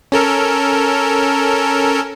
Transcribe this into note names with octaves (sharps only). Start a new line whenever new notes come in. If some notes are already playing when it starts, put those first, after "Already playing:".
C#4 A4 A#4